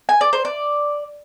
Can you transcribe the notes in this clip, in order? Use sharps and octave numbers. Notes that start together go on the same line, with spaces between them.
G#5
D5
C5
D5